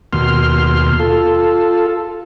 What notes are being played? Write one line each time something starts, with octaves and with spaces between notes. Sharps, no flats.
D#2 B2 C6 F6
F4 A4